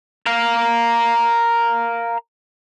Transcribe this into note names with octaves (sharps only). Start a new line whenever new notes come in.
A#4 F5